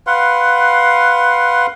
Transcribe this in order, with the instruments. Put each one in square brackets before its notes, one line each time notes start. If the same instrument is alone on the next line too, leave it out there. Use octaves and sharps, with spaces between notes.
[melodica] B4 F5 F#5 C6